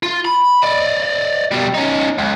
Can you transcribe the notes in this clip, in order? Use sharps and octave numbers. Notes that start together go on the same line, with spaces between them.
F4
B5
D5 D#5
B2 G3
C#4 D#4
C#2